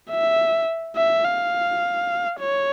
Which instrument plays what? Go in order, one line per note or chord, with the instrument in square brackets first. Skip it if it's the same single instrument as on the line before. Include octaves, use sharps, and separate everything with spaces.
[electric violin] E5
E5
F5
C#5